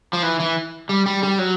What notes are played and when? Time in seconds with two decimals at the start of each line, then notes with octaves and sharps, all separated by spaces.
0.13 F3
0.23 E3
0.40 E3
0.89 G3
1.06 G3
1.23 G3
1.39 F#3